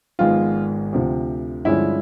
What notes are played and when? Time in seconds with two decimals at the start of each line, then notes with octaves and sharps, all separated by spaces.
0.19 G#1 G#2 F3 G#3 B3 F4
0.93 D2 C3 F3
1.65 G2 D3 F3 G#3 C#4 E4